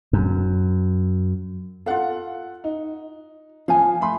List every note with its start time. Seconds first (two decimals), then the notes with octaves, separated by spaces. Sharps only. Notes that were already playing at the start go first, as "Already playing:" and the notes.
0.13 F#2
1.86 F4 A4 F5 F#5
2.64 D#4
3.68 F3 F5 G#5
4.01 A3 B5 C6